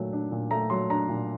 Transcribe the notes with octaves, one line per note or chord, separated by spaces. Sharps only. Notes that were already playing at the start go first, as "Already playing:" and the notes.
Already playing: A#2 F#3 A3
D4
A#2
A3 A#5
F#3 C6
D4 A#5
A#2